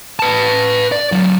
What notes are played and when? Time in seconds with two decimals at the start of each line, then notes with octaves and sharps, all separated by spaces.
0.19 B4 A5
0.92 D5
1.12 F#3 E4